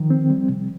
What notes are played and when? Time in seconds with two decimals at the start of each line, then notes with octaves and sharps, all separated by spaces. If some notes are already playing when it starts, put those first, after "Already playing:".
Already playing: D#3 F3
0.10 C4
0.30 G3
0.49 C3